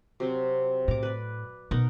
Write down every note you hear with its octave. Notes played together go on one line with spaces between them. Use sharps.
C3 F#3 C4
A2 A#5 D6
B4 D5
B2 D#4 A#4 F#5